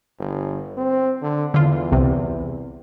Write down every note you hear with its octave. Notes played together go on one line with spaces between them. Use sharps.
G1
C4
D3
E2 D3 F4
C2 C3